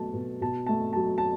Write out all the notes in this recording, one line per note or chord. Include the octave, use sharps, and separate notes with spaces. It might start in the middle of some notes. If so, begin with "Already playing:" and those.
Already playing: B2 F#3 A3 A5
B2
B2 A5
A3 A5
F#3 A5
A5